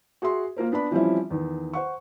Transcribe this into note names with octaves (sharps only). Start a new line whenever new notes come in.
F#4 G#4 E5 C6
A#3 F4 A#4 C5
B3 D4 D5 B5
E3 F3 G3 C4 C#4 E4
E2 D#3
C5 F#5 C#6